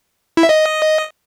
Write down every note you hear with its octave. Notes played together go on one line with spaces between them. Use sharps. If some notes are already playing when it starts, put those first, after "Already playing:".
E4
E5
D#5